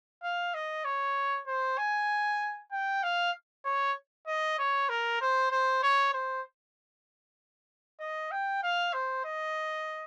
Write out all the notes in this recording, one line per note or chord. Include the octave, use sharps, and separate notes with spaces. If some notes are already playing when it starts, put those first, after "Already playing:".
F5
D#5
C#5
C5
G#5
G5
F5
C#5
D#5
C#5
A#4
C5
C5
C#5
C5
D#5
G5
F5
C5
D#5